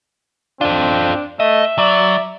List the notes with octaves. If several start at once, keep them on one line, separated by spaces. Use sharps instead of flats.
C4 D4 F4 A4
A3 D#5 E5
F#3 D5